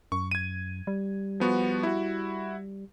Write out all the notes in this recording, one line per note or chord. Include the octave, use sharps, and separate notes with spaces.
F#2 C#6
G#6 D#7
G3
F3 B3 F#4
E4 F#4